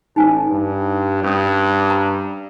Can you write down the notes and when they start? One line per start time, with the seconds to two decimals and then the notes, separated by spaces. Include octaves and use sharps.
0.16 A1 D#4 G#5
0.51 G2
1.23 G2 C#4 D#6
1.90 A#5